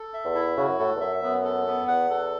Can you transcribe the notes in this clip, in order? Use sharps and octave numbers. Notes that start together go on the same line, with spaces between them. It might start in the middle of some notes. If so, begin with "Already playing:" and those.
Already playing: A4
E5
E2
E4
C#3 F#4
F#2
A2 A4
E2
F#2 E5
F#2 B3
A4
B3
E2 F#5
A4